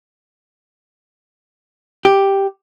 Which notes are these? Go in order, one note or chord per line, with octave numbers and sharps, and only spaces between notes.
G4